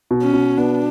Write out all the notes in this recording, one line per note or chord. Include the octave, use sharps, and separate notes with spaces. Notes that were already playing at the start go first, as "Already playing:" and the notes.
B2
C#4
B2
B3 D4